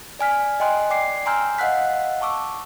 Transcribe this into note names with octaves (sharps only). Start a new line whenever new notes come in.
D5 G#5 F6 B6
D#5 G5 G#5 C6 F#6
D5 G5 D6 C7
G#5 A#5 C6 E6 F6 G6
D#5 F5 F#5 E6 F#6 B6
A5 C#6 D6 E6